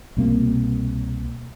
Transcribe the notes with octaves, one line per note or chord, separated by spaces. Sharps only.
C2 B2 A#3 C4